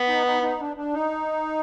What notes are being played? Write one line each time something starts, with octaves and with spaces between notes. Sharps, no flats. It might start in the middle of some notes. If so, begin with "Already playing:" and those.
Already playing: B3
D#4
D#4
D#4
D4
D4
D#4